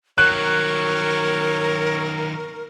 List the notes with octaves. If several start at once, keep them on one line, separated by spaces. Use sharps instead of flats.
D#3 F#3 A#4 C#5 F#6